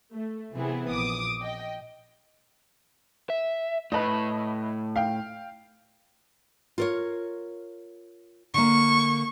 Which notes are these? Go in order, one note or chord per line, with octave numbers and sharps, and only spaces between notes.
A3
C3 E3 B3 C4 E4 G#4
A#1 D6 D#6
D#5 G5
E5
A2 B4 D#5 B5
F5 G5
F4 A#4 C#5
D3 A#3 C#6